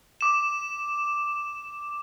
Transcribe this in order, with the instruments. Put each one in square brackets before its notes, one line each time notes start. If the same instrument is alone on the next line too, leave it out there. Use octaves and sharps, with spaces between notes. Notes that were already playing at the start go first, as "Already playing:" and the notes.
[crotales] D6 E7